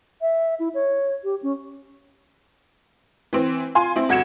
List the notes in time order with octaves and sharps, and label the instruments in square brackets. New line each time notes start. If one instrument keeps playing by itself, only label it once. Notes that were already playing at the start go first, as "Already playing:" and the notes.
[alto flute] E5
E4
C#5
G4
C#4
[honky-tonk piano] E3 C4
F4 G#5 C6
C4 E4
G1 F#4 G#6 C#7 E7